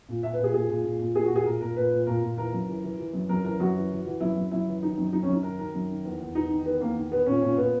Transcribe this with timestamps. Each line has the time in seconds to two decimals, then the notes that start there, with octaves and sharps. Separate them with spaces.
0.08 A#2
0.23 A#2 E5
0.33 B4
0.39 A#2 G#4
0.54 A#2 G#4
0.69 A#2
0.84 A#2
1.00 A#2
1.15 A#2 G#4
1.25 F#4
1.30 A#2
1.36 G#4
1.46 A#2 A#4
1.61 A#2 A#4
1.76 A#2 B4
1.92 A#2
2.07 A#2 A#4
2.22 A#2
2.37 E3 A#4
2.53 F#2
2.68 E3
2.83 E3
2.99 E3
3.13 F#2
3.29 F#2 A#4
3.44 E3 A#4
3.60 F#2 F#4
3.75 E3
3.90 E3
4.05 E3
4.20 F#2 E4
4.37 F#2
4.51 F#2 E4
4.67 E3
4.82 D#3 D#4
4.98 F#2
5.13 F#2 D#4
5.23 C#4
5.28 F#2 D#4
5.43 D#3 A#4
5.59 D#3 A#4
5.74 F#2
5.90 D#3
6.05 E2
6.20 E2
6.35 E2 D#4
6.51 D#3
6.66 D#3 B3
6.81 E2 A#3
6.96 D#3
7.12 D#3 B3
7.26 A#2 C#4
7.42 A#2 C#4
7.57 A#2 B3